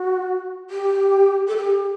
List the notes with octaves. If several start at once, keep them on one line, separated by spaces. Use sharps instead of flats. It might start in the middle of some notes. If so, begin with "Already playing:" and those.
Already playing: F#4
G4
A4
G4